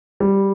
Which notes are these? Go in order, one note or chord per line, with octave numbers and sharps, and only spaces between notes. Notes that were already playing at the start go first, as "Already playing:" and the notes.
G3